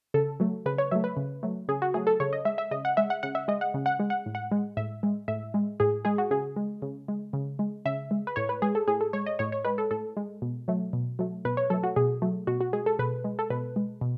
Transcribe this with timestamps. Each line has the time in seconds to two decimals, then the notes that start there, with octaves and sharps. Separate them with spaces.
0.14 C#3 A4
0.40 F#3 A3
0.66 C#3 B4
0.78 C#5
0.91 F#3 A3 E5
1.04 B4
1.17 C#3
1.43 F#3 A3
1.68 C#3 G#4
1.82 F#4
1.94 F#3 A3 G#4
2.07 A4
2.20 C#3 C#5
2.33 D#5
2.45 G#3 E5
2.58 E5
2.71 C#3 D#5
2.85 F#5
2.97 G#3 E5
3.10 F#5
3.23 C#3 F#5
3.35 E5
3.48 G#3 D#5
3.61 F#5
3.74 C#3
3.86 F#5
3.99 G#3
4.10 F#5
4.26 A2
4.35 F#5
4.52 G#3
4.77 A2 E5
5.03 G#3
5.28 A2 E5
5.54 G#3
5.80 A2 G#4
6.05 G#3 G#4
6.18 F#4
6.31 C#3 G#4
6.56 G#3
6.82 C#3
7.08 G#3
7.33 C#3
7.59 G#3
7.85 C#3 E5
8.11 G#3
8.27 B4
8.36 A2 C#5
8.49 B4
8.62 G#3 G#4
8.75 A4
8.88 A2 G#4
9.01 A4
9.13 G#3 C#5
9.26 D#5
9.39 A2 C#5
9.52 C#5
9.65 G#3 B4
9.78 A4
9.91 A2 A4
10.17 G#3
10.42 B2
10.68 F#3 A3
10.93 B2
11.19 F#3 A3
11.45 B2 B4
11.57 C#5
11.70 F#3 A3 A4
11.83 F#4
11.96 B2 G#4
12.22 F#3 A3
12.47 B2 F#4
12.61 F#4
12.73 G#3 G#4
12.86 A4
12.99 B2 B4
13.24 G#3
13.39 A4
13.50 B2 B4
13.76 G#3
14.01 B2